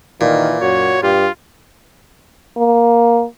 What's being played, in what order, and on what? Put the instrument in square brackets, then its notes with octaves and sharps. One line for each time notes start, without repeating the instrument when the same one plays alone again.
[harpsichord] A#2 [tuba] D#3 [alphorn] E3
[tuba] F#2 [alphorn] F#4 [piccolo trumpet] C#5
[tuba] G2 [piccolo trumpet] F4 [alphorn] G4
[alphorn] A#3